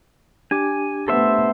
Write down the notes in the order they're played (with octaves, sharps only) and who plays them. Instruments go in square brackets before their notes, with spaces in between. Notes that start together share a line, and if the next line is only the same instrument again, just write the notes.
[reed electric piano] D4 G4 D6 [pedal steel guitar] G#5
[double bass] A3 B3 [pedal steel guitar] A4 C5 E5